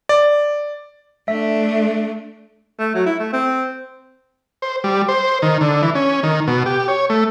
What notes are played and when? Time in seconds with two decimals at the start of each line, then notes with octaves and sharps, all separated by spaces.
0.09 D5
1.28 A3 D4 E5
2.79 A3
2.94 F#3
3.06 E4
3.19 A3
3.33 C4
4.62 C5
4.84 G3
5.08 C5
5.42 D#3
5.61 D3
5.82 E3
5.95 C#4
6.23 D#3
6.47 B2
6.66 G4
6.88 C#5
7.10 A3